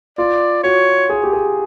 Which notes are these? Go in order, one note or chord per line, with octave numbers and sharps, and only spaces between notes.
F4 D5
F#4 C#5
G#4
G4
G#4